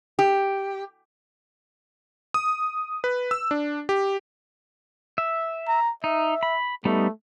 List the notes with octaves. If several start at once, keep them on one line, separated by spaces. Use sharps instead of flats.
G4
D#6
B4
E6
D4
G4
E5
A#5
D#4 E5
B5
G3 A3 B3 D#4